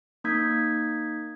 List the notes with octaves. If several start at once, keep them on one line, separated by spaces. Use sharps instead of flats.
A#3 D#4 D#6 G6 G#6 B6